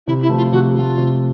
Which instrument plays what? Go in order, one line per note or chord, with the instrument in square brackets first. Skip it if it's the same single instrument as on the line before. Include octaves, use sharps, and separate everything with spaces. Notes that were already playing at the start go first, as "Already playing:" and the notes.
[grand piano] C3 [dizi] E4
[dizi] E4
[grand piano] F3 A3
[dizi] F4
[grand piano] C3 [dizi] F#4
[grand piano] F3 A3 [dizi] F4
[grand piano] C3